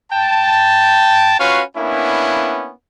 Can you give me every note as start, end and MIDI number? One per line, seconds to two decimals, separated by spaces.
0.11 1.35 79
0.11 1.35 81
1.40 1.62 61
1.40 1.62 65
1.40 1.62 66
1.40 1.62 71
1.40 1.62 77
1.77 2.72 58
1.77 2.72 59
1.77 2.72 61
1.77 2.72 62
1.77 2.72 64